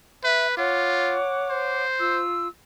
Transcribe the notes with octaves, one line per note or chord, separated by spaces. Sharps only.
B4 E5
F4 C#5 F#5 D6
C5
F4 E6